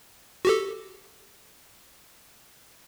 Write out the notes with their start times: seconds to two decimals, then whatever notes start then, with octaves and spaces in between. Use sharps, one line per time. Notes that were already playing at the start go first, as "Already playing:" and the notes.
0.45 F#4 G4 A4